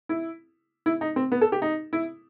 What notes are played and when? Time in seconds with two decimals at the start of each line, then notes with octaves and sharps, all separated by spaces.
0.09 E4
0.86 E4
1.01 D#4
1.16 C4
1.32 B3
1.41 A4
1.52 G4
1.62 D#4
1.93 E4